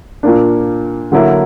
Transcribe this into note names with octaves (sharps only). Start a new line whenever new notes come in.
A#2 A#3 D4
D3 F#3 A#3 E4